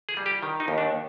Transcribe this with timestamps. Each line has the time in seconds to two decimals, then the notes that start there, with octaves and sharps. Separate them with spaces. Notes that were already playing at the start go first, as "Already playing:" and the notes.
0.09 G#4
0.17 G3
0.26 G4
0.43 D#3
0.60 D#4
0.68 D#2
0.78 D4